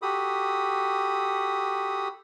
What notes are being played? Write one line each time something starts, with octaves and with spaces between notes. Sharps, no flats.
F#4 G4 A4 B5 D#6